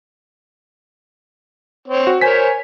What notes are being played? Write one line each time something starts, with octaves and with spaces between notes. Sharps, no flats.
C4 C#5
F#4
A#4 C5 C#5 G#5 B6